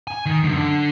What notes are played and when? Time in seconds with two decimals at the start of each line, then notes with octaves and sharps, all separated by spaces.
0.07 G#5
0.26 D#3
0.43 F#2 D3
0.56 D3